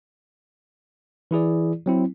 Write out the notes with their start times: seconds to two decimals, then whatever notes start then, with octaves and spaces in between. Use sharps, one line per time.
1.31 E3 E4 G#4 D5
1.86 F#3 C4 E4